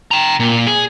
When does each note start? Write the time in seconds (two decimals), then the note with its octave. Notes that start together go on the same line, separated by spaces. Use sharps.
0.11 G5 A#5
0.40 A#2
0.67 G#4